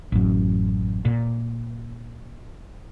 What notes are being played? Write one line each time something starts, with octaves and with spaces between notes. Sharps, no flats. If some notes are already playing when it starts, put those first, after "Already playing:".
A1 F#2
A#2